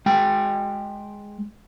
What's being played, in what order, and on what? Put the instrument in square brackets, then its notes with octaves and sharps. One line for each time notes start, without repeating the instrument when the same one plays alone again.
[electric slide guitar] G#3 G5